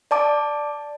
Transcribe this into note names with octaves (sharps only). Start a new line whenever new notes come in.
D5 A5 D6